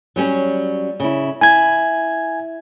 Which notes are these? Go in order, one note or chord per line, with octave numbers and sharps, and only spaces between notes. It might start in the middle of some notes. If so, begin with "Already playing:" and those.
F#3 G3 C#4
C#3 E4
E4 G#5 G#6